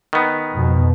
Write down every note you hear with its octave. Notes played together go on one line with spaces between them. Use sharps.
D#3 B3
F2 B2